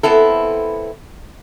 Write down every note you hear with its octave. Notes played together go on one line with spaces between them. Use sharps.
B3 C4 E4 A4